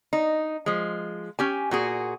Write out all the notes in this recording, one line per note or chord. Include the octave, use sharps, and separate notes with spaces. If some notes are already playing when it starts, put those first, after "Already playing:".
D#4
F3 G#3
C#4 G4 G#5
A#2 F#4 G#4